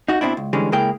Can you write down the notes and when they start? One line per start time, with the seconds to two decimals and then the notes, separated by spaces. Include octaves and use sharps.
0.08 D#4 F#4
0.21 B2 C4 D4 E4
0.37 C#2
0.53 D3 E3 G3 G#3 C#4
0.72 C#3 G#3 A#3 E4 G#4 G5